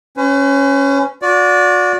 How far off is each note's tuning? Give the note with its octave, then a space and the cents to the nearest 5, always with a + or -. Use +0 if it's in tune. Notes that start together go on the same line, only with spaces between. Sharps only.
C#4 +0 B4 +45
F#4 -35 D5 -15